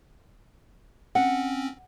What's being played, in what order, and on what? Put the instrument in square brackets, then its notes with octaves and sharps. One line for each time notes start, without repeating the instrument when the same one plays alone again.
[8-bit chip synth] C4 C#4 [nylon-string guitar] F#5